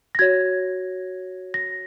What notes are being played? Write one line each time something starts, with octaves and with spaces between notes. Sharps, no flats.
A#6
F#4 C#5 G#6
A#6